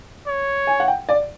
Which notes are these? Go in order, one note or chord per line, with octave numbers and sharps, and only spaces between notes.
C#5
G#5
F#5
G5
D5